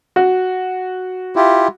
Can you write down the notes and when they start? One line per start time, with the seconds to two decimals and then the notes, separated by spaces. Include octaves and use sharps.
0.16 F#4
1.36 E4 F4 G4